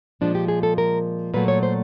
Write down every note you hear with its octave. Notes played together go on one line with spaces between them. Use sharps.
A#2 F3 G#3 D4
G4
G#4
A4
A#4
A#2 F#3 A3 B4
C#5
C5